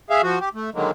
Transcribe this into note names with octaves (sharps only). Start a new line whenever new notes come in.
G#4 E5 F5
F3 F#4
G4
A3
D3 D#3 F#3 G#3 A#3